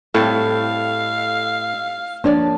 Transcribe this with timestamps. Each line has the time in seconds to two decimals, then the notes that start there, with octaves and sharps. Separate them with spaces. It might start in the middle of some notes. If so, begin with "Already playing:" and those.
0.15 A2 G3 C4 A4 F5
2.24 F3 A#3 D4 C#5 D5